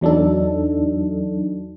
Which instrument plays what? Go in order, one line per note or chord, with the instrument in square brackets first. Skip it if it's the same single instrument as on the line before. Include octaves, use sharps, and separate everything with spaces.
[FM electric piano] E2 F#3 D4 D#4 A4